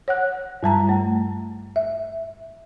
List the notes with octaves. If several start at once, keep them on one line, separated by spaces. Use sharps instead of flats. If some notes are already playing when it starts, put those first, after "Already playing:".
C#5 F#5 F#6
G2 G3 A5 A#5
A3
E5